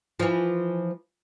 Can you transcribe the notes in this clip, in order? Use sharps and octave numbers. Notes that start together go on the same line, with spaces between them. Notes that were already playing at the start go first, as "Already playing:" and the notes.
E3 F3